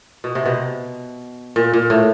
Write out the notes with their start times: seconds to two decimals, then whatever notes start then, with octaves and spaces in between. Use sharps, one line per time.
0.24 B2
0.35 C3
0.46 B2
1.56 A#2
1.74 A#2
1.90 A2